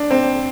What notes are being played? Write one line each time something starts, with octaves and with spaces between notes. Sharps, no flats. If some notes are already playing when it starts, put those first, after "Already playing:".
Already playing: D4
C4